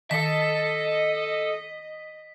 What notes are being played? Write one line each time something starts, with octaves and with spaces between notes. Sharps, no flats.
D#3 A4 D#5 A5 B6